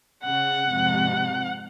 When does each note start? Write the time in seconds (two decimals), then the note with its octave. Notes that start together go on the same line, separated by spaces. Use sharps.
0.24 C#3 F#5
0.68 F2 G#2 C3